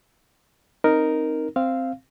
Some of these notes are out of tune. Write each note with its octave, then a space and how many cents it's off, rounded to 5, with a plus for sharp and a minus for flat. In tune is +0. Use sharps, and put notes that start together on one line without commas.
C4 +20 D#4 +0 A#4 +0
C4 +0 F5 -10